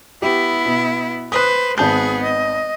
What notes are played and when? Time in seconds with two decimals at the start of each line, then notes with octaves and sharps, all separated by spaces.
0.22 B3 E4 G4
0.66 B2
1.32 B4 C5 D#6 F#6
1.78 G#1 B3 G#4 A5 G6
2.23 D#5